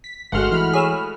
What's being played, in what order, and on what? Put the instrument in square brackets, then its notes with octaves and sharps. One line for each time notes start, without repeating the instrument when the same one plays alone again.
[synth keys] B6
[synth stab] G1 [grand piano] G#3 A3 F#4 [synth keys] F#5 C6 F6
[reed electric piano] E3 [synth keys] B5 F6
[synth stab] G#4 C#5 E6